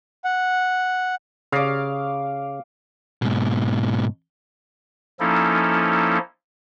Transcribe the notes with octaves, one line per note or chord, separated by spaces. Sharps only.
F#5
C#3 F5 D6
G#2 B2
F3 A#3 C#4 D#4 E4 A4